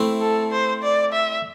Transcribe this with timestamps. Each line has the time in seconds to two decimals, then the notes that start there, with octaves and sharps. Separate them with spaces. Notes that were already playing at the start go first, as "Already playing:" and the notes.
Already playing: A3 C4 E4
0.21 A4
0.51 C5
0.83 D5
1.13 E5